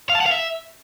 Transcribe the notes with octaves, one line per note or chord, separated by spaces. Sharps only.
F5
A5
F#5
F5
E5